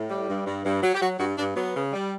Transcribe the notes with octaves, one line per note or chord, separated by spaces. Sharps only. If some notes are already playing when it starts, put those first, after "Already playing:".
Already playing: A2
G3
G2
G2
G2
F#3
G4
F#3 F#4
G2 F#4
G2 D4
F#3 B3
C#3
G3